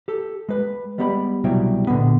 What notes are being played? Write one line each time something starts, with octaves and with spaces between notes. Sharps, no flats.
G4 A4
G#3 B4
G3 G#3 B3 G4 D5 B5
C2 B2 F#3 G3 E4 G5
A#2 D3 E3 B3